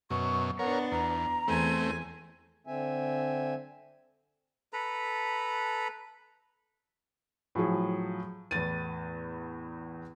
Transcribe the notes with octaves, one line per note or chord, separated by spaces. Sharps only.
F#2 B2 C#6
B3 D4 A#4 C#5 F#5
E2 A#5
E2 A3 C4 G#5
D3 C4 E5 G#5
A4 B4 A#5 B5
A2 F3 F#3 G#4
E2 A2 A6 D#7